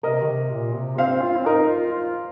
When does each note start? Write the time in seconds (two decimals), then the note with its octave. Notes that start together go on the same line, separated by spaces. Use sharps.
0.03 C3 A#4 D#5
0.22 D#3
0.28 C3
0.51 A#2
0.75 C3
0.98 C4 C5 F5
1.22 F4
1.37 C4
1.46 D#4 A#4 D#5
1.69 F4
1.93 F4